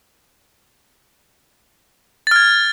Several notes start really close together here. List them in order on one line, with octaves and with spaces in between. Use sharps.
A6 F6 G#6